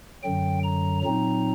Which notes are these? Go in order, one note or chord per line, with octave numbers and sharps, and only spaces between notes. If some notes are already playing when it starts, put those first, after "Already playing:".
F#2 D3 F#3 G5
A#5
A#2 F#3 C4 D#4 A#5